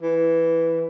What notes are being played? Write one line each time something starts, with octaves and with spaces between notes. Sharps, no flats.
E3